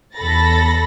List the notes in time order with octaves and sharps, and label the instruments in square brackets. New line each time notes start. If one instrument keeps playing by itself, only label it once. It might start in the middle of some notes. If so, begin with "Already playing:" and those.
[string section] E2 A4 B5 A6 A#6